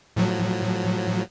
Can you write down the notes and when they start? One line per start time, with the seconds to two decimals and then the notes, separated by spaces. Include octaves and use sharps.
0.17 A2 F3 F#3